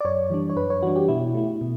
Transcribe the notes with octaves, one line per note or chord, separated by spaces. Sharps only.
D5
F#2 C#5
E3 G3 D4
C#5
F#2 B4
C#5
E3 G3 D4 F#4
G4
B2 E4
A3 E4
B2